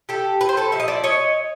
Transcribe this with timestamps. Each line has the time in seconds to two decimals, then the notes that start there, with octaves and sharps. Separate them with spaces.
0.09 G4 A4
0.41 B4
0.49 C5
0.57 A4 B4
0.72 A#2 F3 A3 E5
0.80 D#5
0.88 D5 E5
1.04 C#5 D#5